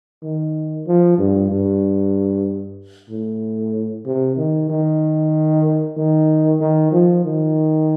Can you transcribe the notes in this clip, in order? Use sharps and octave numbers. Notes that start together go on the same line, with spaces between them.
D#3
F3
G2
G2
A2
C3
D#3
D#3
D#3
D#3
F3
D#3